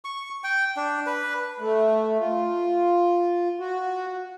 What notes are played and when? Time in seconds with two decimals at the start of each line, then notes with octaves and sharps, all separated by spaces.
0.05 C#6
0.44 G5
0.77 D4
1.06 B4
1.60 A3
2.19 F4
3.60 F#4